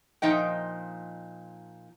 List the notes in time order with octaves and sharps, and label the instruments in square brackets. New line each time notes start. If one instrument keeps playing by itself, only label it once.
[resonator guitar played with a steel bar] A#2 F3 D#4 D#5 G5